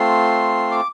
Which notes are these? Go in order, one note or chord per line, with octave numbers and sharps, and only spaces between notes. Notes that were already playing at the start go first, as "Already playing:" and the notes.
Already playing: A3 C4 F4 C6
D6